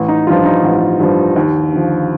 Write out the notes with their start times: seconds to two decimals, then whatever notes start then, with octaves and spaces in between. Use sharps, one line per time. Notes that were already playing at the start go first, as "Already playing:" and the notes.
Already playing: A1
0.08 D#4
0.27 G2 F3 F4
0.45 D#4
0.64 A1
1.00 G2 F3
1.36 D#2
1.72 D3 F3